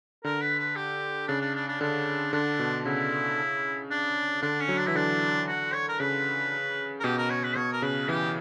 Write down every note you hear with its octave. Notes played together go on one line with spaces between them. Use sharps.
D3 A#4
B4
B4
G4
C#3 D4
D4
D4
D4
D3 D4
D3 D4
B2
C#3 E4
D4
D3 D4
C#4
F#3
D4
E3 E4
D3 D4
F#4
C#5
A#4
C#3 B4
A#4
B2 G4
A#4
C#5
B4
B2 C#5
A#4
C#3 B4
E3 G4